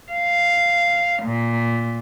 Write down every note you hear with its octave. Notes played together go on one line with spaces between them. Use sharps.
F5
A#2